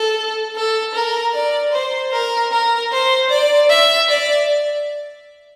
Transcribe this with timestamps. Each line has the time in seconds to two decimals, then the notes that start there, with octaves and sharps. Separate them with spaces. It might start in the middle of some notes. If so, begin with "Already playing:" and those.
Already playing: A4
0.56 A4
0.95 A#4
1.34 D5
1.73 C5
2.13 A#4
2.52 A#4
2.91 C5
3.30 D5
3.70 E5
4.09 D5